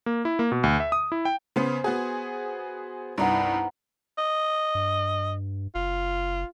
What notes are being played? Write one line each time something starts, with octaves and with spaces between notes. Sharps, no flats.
A#3
E4
A#3
B2
D2
E5
D#6
E4
G5
C#3 B3 C5
B3 F#4 G#4
C2 G2 B3 D#4 E4
D#5
G2
F#1 F4